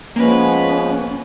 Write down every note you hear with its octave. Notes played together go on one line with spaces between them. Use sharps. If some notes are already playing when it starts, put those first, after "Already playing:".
F3 G#3 A#3 B3 C#4 B4